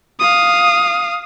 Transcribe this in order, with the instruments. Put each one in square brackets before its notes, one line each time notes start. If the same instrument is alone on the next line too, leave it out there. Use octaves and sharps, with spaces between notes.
[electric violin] F5 D#6